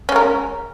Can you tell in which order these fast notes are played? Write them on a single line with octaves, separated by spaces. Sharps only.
C#4 G#3 A#4